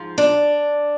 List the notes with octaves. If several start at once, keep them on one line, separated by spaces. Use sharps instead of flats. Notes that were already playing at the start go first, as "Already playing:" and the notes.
Already playing: G#2 F3
D4